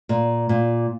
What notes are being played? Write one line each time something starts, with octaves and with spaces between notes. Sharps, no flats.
A#2
A#2